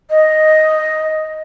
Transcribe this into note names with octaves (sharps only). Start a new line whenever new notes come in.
D#5